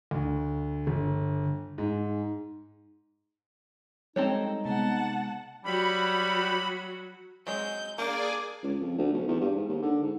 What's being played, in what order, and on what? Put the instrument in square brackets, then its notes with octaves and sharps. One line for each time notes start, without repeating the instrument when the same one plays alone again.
[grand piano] D2
G1
G#2
[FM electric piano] G3 G#3 [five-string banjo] C4 A4 C#5 [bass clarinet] D#4
[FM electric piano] C3 G#3 B3 [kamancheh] F#5 A5
[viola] F#3 F#4 [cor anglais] G3 [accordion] B5
[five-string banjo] F#3 G#3 C4 [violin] G6
[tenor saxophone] A#3 [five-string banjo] D4 A#4 [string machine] G#4 D5 G#5 [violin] D6
[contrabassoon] C#2
F2
D2
B1
E2
G2
G#2
D#2
D3
G#2